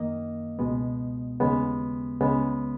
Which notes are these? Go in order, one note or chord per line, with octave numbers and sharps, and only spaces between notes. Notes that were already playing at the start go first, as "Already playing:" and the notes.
Already playing: F#2 D#3 A#3 D#5
C#2 B2 G#3 B3
D#2 C#3 G#3 B3
C#2 C#3 G#3 B3